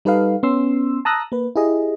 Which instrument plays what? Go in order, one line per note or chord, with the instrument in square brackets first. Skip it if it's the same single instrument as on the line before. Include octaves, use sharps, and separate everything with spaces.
[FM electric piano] G3 D#4 A4 B4 D#5 F5
B3 C#4 C6 E6
A5 A#5 D#6 E6 F#6 A#6
A#3 B4
E4 G4 G#4 D#5